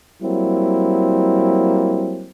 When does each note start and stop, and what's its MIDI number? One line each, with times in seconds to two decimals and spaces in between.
0.22 2.30 54
0.22 2.30 55
0.22 2.30 58
0.22 2.30 60
0.22 2.30 64